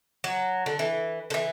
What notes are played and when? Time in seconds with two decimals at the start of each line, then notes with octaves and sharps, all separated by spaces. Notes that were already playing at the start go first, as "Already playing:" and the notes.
0.24 F#3
0.66 D3
0.79 E3
1.30 D3
1.34 E3